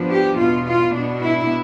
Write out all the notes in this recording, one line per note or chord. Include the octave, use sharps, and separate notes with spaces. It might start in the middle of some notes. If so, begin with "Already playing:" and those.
Already playing: G2 F3 B3 D4
G4
E2 B2 B3 F4
F4
B2 B3 D4
E4